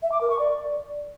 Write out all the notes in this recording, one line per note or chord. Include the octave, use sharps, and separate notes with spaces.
E5
D6
A#4
C#6
D5